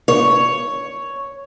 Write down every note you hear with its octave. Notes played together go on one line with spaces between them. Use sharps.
C#5